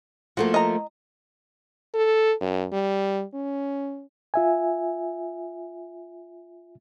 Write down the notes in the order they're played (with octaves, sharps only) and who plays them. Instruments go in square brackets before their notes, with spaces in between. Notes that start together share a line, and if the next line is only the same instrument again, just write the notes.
[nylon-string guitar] F3 A3 A#3 [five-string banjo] F#4
[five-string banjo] D#5 A#5
[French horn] A4
F#2
G3
C#4
[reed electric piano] F4 E5 G#5